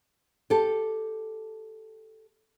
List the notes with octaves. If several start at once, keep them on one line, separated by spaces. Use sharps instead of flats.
G4 A4